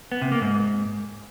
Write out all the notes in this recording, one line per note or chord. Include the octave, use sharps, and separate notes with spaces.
B3
C3
A#3
G#2